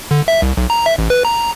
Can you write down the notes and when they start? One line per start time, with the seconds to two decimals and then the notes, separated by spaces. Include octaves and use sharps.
0.11 D3
0.28 E5
0.42 C2
0.57 B1
0.70 A#5
0.86 E5
0.98 A1
1.10 B4
1.25 A#5